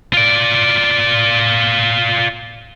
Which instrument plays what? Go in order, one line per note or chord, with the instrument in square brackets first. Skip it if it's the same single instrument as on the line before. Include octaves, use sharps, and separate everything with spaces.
[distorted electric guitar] F4 D5